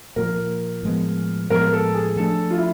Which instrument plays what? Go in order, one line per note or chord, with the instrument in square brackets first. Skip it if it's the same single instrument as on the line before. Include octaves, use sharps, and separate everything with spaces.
[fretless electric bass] A#2 F3 A#3 [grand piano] A#4
[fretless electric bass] A2 F3 G#3 B3
[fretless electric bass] A2 F3 G#3 B3 [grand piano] A#4
[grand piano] A4
G#4
[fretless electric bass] F3 A3 D4 [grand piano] A4
[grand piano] F4
E4